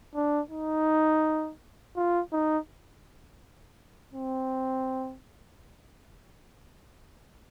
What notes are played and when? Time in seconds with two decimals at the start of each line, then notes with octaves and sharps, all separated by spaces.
0.15 D4
0.51 D#4
1.96 F4
2.33 D#4
4.14 C4